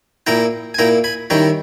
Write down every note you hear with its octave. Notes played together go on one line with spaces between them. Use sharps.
A#2 A#3 E4 G5 A#5
G#5
A#2 A#3 E4 G5 A#5
G#5 B5
D#3 G3 C#4 E4 G5 A#5